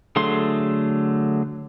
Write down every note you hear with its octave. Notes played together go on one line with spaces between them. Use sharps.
D3 F#3 A3 G#4 C6